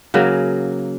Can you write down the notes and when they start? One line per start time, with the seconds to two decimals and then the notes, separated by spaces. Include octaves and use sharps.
0.14 C#3 F#3 A#3